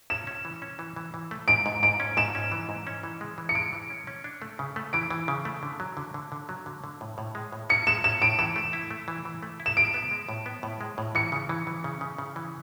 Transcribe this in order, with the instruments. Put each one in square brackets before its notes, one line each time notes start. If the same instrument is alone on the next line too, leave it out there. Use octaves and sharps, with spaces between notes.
[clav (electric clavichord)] C#4 [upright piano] E7
[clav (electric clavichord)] C#4
E3
C#4
E3
E3
E3
A3
[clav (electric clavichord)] G#2 [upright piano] D7
[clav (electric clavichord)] G#2
[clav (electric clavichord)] G#2 [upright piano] D7
[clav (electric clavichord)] C#4
[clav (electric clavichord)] G#2 [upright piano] E7
[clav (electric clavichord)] C#4
E3
G#2
C#4
E3
G#3
E3
[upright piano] C#7
[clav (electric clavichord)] G#3 [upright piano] D7
[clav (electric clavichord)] E3
C#4
C#4
D4
A3
C#3
A3
[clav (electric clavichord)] E3 [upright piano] D7
[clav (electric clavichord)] E3
C#3
A3
D3
F#3
D3
D3
D3
F#3
D3
D3
A2
A2
G#3
A2
[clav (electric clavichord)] C#4 [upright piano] C#7
[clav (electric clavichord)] G#3 [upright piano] E7
[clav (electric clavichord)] C#4 [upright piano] E7
[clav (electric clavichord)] A2 [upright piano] D7
[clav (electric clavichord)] E3 [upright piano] E7
[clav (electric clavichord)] A3
E4
A3
E3
E3
A3
E4
[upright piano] E7
[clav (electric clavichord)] G#3 [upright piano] D7
[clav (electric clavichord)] B3
G#3
A2
B3
A2
G#3
A2
[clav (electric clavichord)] E3 [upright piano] C#7
[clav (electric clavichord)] C#3
E3
E3
C#3
C#3
C#3
E3